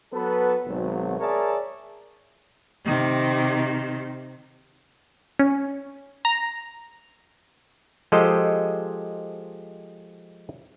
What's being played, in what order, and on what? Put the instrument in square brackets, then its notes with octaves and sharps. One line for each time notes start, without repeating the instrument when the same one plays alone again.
[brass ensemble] F#3 B3 F#4 A4 B4
G#1 B2 F#3
G#4 A#4 C#5 D5 E5 A5
[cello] C3 D#3
[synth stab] C#4
A#5
[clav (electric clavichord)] F3 G#3 G4 A4 C5 D#5